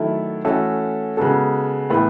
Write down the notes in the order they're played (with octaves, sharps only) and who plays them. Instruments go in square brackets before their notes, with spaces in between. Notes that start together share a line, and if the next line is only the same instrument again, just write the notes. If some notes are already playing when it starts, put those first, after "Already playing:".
Already playing: [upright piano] D#3 F#3 A3 E4 A4
E3 A3 C#4 F#4 A4
C#3 G#3 B3 F#4 A4
A2 E3 B3